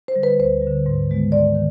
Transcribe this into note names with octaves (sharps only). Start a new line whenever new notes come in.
C5
D3 G3
B4
D2 C5
G3
D3
G#2
D#3 G#3 B3
G#2 D5
D#3